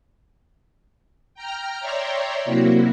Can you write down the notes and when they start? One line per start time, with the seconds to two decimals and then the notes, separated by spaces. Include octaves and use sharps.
1.34 G5 A#5 F6
1.80 C#5 D5 E5 G5 A#5 C6
2.45 C3 F#3 A#3 E4 F#4